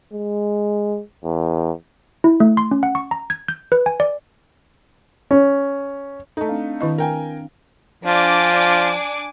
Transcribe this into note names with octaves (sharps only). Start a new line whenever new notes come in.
G#3
E2
E4
A3
C6
C#4
F#5
C#6
A#5
G#6
G6
B4
G#5
D5
C#4
A3 D#4 A4 D#5
C4 D4 F5
D#3 E4 D#5
A#4 G5 G#5
F3 D4 G#5 D6